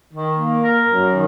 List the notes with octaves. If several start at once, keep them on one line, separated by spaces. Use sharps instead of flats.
D#3
A#3
A#4
F#2
D#3